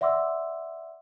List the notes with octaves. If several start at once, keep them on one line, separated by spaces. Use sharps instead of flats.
D5 E5 F#5 C6 D6 E6